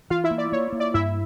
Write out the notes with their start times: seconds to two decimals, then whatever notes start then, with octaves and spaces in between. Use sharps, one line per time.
0.10 E3 F4 F5
0.24 E4 E5
0.31 A#3
0.38 D5
0.52 A#3 C#5
0.73 A#3
0.80 D5
0.94 G2 E4 E5